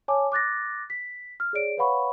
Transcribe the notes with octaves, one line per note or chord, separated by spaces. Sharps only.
C#5 G#5 A5 D6
D6 F#6 A6 A#6
B6
F6
G#4 C#5 D5 D7
B4 C#5 F5 F#5 B5 C#6